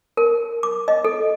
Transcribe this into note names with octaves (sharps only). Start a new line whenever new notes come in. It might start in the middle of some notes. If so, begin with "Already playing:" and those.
A#4
D6
D#5
A4